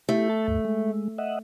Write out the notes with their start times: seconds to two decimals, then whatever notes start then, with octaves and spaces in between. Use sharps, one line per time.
0.09 A3 E4 G4 A4
0.29 A5
0.48 D2 G2
0.65 G#3
1.18 D#5 E5 F#5